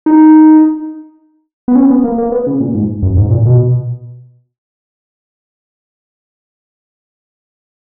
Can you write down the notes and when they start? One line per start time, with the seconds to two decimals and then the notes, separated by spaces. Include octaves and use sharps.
0.06 D#4
1.68 B3
1.76 C#4
1.90 B3
2.04 A#3
2.18 A#3
2.32 B3
2.47 C#3
2.60 A#2
2.75 G#2
3.02 F#2
3.17 G#2
3.31 A#2
3.46 B2